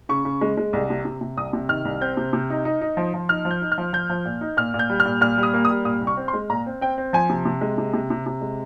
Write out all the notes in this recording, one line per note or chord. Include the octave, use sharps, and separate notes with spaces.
C#3 C#6
C#3
G#3
G#3
C2
C3
C3
C3
C2 D#6
C3
D#3 F6
C2
C4 G6
C3
C3
D#4
D#4
D#4
F3
F3
D#4 F6
F3
G6
D#4
F6
F3
F3 G6
F3
A#2
D#4
A#2 F6
A#2
G6
G3
F6
A#2
A#2 F6
G3
D#6
A#3
D#6
G3
A#2 D#6
C2
C#6
C4
C6
G#3
A#2 A#5
C4
C4 G5
C4
F3 G#5
C3
C3
G#3
C3
C3
C3
C3
G#3